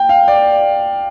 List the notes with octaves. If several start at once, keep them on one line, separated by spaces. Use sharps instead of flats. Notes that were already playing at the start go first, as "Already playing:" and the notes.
Already playing: G5
F5
D5